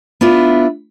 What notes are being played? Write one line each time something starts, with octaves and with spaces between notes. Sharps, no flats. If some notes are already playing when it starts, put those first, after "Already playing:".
B3 D4 E4 F4